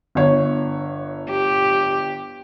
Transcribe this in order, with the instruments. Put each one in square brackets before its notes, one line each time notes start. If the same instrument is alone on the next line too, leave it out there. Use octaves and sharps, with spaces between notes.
[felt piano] G1 C#5
[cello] G4